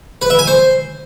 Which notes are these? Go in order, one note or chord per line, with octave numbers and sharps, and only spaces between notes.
B4
E5
G#5
C5